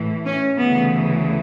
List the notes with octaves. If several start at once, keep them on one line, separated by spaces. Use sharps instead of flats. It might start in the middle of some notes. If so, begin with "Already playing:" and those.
Already playing: A2 E3
C#4
D2 C#3 E3 B3